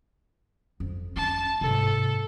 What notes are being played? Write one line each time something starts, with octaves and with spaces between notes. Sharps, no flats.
F2
C#4 D4 A5
G#2 C3 A4